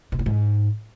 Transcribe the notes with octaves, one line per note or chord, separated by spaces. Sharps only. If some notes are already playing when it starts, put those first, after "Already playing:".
B2
A2
G#2